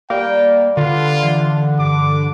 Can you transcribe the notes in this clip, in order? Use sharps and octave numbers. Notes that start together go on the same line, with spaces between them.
G3 A#3 G5
D3 F4 B4
E3
G2 D6